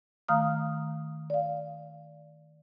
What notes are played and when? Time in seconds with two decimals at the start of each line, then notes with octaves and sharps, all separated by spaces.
0.28 D#3 A3 F5 A#5 D#6 F6
1.30 D5 F5